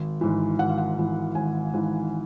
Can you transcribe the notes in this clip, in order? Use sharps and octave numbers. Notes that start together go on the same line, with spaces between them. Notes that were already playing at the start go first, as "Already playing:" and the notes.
Already playing: G#1
G#2 E3
G#1 F#5
F5
F#5
G#2 E3
G#1 G#5
G#2 E3